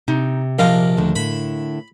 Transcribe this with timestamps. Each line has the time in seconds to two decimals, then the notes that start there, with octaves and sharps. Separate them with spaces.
0.08 C3 D#4
0.59 A#1 D4 A#4 D#5 F5
0.97 D#2 D3 A3
1.16 A2 D3 B5